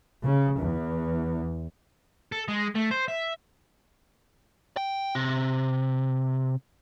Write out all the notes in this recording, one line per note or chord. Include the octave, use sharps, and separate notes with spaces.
C#3
E2
A4
G#3
A3
C5
E5
G5
C3